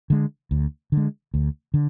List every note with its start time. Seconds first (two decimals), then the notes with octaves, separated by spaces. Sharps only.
0.10 D3 G#3
0.51 D2
0.92 D3 G#3
1.34 D2
1.74 D3